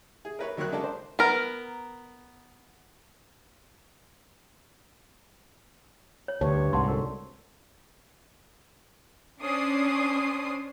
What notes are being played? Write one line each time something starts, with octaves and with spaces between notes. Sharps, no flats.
G#4
A#4 B4 C#5
D#3 F#3 A#4 C#6 F#6
C#3 G#3 D4 F#4 A4 A#4
C5
B3 A#4
C#5
D2 G2 C#5 A5
C2 G#2 F#5 A5 C6
D2 A#4
C#4 D4 C5 D#6 C7